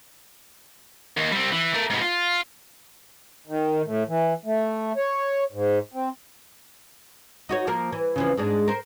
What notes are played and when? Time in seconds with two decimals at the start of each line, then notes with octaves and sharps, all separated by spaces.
1.17 D#2
1.32 G3 C4
1.52 E3
1.74 A3 A#4
1.90 G#2 B2
2.01 F4
3.47 D#3
3.84 A2
4.08 E3
4.45 A3
4.97 C#5
5.52 G#2
5.94 C4
7.49 D#4 F#4 C#5
7.67 F3 A#3 A#4
7.92 E3
8.16 C#3 E3 F3
8.37 G#2 G#3 D4
8.68 A#4 C5